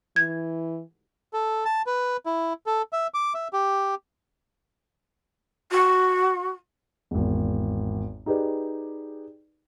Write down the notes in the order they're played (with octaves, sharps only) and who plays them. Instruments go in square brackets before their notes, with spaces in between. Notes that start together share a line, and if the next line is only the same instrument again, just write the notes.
[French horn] E3 [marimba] G#6
[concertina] A4
A5
B4
E4
A4
E5
D6
E5
G4
[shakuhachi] F#4
[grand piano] G#1 E2
D#4 G4 G#4 B4 D5